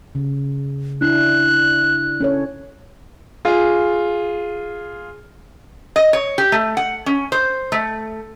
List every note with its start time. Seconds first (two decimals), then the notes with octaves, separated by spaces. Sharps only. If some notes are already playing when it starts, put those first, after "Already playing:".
0.15 C#3
1.01 D4 E4 F#6
2.21 C#4 A4 C#5
3.45 F4 G#4
5.96 D#5
6.13 C#5
6.38 G4
6.52 A3
6.77 F#5
7.06 C#4
7.32 C5
7.72 A3